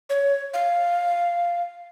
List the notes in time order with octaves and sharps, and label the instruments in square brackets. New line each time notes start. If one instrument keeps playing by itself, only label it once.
[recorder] C#5
F5